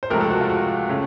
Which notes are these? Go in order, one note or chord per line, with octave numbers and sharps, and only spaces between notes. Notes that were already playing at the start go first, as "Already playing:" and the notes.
C5
C#2 C3 F3 A3 A#4
A4
F#4
F4
F#4
C#3 A3